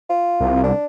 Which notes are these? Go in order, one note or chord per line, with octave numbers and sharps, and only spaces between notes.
F4
C2
D4